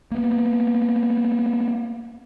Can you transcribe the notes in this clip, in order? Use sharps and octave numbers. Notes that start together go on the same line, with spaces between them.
A#3 B3